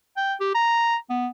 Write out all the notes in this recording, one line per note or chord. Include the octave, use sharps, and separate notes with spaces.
G5
G4
A#5
B3